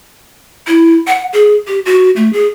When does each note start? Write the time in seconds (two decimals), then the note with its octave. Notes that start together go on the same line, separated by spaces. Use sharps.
0.67 E4
1.07 F#5
1.33 G#4
1.67 G4
1.86 F#4
2.16 A3
2.33 G#4